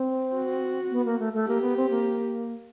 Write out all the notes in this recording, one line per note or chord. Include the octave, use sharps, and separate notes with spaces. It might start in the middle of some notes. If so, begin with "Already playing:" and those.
Already playing: C4
F#4
B3
A#3
A3
A3
A#3 G4
B3
C4
A#3